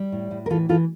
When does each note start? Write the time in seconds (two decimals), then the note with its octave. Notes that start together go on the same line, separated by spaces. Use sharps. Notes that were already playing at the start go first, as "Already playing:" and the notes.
Already playing: G3
0.12 A2
0.31 A2
0.46 A#4
0.50 E3 F4 A4
0.69 E3 F4 A4